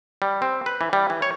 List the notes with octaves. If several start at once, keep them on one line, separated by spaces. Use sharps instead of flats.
G3
C4
B4
E3
G3
E3
C#5